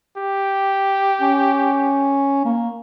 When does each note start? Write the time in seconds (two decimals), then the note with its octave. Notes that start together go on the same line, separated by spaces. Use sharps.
0.17 G4
1.21 C#4
2.45 A#3